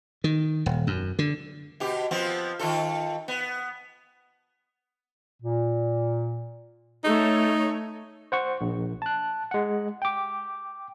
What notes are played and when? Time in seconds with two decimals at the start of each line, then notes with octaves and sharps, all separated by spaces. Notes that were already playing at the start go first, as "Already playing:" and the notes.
0.24 D#3
0.66 D#1
0.87 F#2
1.19 D3
1.80 B2 G4
2.11 F3 B3 C4
2.59 D#3 F4 A4
3.28 B3
5.43 A#2
7.04 A3 D#4 C#5
8.32 C5 F#5 C#6
8.61 A#1
9.02 A5 F#6
9.51 G#3 F#5
10.02 G5 D6